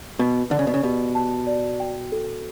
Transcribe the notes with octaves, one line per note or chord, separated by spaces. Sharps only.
B2 B4
D3 D5
C#3
B2
C#3
B2 G4
A5
D5
G5
A4